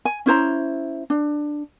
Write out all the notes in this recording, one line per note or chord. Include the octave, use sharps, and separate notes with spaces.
G#5
C#4 E4 C5 A#5
D4